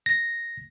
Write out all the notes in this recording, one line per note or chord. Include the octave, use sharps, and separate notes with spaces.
A#6